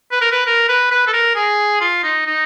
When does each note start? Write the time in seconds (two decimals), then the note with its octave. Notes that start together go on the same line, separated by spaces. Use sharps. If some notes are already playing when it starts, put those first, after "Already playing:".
0.12 B4
0.21 A#4
0.31 B4
0.46 A#4
0.69 B4
0.91 B4
1.07 A4
1.13 A#4
1.36 G#4
1.81 F4
2.03 D#4
2.26 D#4